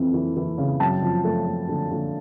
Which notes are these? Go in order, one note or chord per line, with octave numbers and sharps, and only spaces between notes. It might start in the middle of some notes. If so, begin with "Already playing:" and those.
Already playing: F2 E3
E3
E3
C#3
F#2 G5 A5
F3
A3
A3
D3
D3